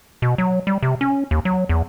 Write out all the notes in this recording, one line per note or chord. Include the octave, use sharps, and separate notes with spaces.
B2
F#3
G3
C3
C#4
D#2
F#3
E2